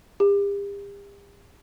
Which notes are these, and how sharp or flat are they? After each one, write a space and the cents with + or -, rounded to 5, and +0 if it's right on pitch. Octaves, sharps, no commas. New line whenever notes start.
G4 +40